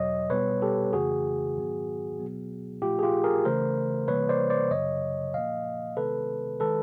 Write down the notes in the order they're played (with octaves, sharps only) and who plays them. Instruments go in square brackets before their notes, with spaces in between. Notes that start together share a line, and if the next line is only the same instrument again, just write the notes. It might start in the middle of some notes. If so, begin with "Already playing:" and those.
Already playing: [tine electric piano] E2 B2 F#3 C#5 D#5
B2 G3 B3 B4 C#5
G4 A4
F2 C#3 E3 A3 F#4 G#4
G#2 D#3 F#3 B3
B2 F#3 B3
A#2 F3 A3 F4 G4
G#4
F4 G4
G#4 A#4
C#3 E3 A3 A#4 C5
C3 E3 G3 A#3 B4 C#5
C5 D5
C5 D5
F#2 C#3 F#3 C#5 D#5
A#2 F3 A#3 D#5 F5
C3 D#3 G#3 B3 A4 B4
D#3 G#3 A4 B4